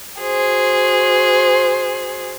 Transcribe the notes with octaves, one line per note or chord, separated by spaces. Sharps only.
F#4 G#4 C5